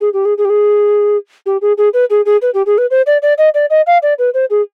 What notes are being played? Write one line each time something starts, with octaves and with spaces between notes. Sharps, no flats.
G#4
G4
G#4
G#4
G4
G#4
G4
G#4
G#4
B4
G#4
G#4
B4
G4
G#4
B4
C5
D5
D5
D#5
D5
D#5
F5
D5
B4
C5
G#4